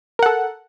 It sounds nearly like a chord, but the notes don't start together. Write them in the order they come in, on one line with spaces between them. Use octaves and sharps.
A#4 F#5 A4